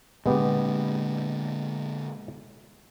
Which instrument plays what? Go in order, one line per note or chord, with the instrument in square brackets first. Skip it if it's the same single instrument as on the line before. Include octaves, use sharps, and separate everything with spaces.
[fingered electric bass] A#2 D3 [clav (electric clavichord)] G#3 B3 G4